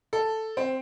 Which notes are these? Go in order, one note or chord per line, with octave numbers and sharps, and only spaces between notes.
A4
C4